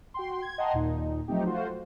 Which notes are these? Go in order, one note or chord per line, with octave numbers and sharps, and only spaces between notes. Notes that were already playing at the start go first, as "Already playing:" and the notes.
F#4 G5 C6
G#6
D#5 F#5 G5 A5 A#5 C6
D#2 A#2 D#4
F3 F#3 A3 C4 D#4 G4
A3 F4 F#4 C5